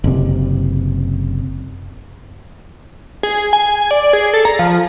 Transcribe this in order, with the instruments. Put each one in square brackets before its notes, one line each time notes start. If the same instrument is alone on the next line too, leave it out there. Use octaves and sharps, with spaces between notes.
[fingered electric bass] F#1 C3
[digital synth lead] G#4
G#5
D5
G#4
A4
A#5
F3